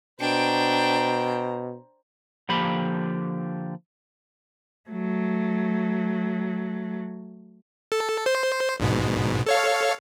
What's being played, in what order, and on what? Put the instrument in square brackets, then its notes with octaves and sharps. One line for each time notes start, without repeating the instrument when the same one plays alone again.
[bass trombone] B2 [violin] D4 G5 [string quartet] C5 A#5
[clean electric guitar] D3 F3 A#3 G4 B5
[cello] F#3 A3
[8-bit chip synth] A4
C5
A#1 G#2 B2
A4 C#5 F5